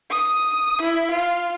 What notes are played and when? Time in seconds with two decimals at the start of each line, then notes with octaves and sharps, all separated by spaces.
0.10 D#6
0.81 E4
1.11 F4